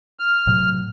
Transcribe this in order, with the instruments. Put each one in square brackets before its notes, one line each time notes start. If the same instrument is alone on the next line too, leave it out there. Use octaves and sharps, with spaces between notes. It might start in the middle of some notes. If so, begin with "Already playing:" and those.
[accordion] F6
[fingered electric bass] A2 C3 F#3